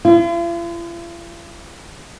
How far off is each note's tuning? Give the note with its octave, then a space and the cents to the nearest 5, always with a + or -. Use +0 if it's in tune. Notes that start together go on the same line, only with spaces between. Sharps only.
F4 -45